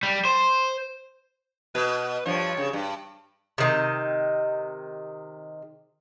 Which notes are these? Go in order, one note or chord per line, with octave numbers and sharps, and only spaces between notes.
G3
C5
B2 B4
G2 F3 C#5
C#3
G2
C3 D#3